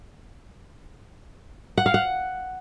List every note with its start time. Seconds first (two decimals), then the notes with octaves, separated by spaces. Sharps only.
1.78 F#5
1.86 F5
1.94 F#5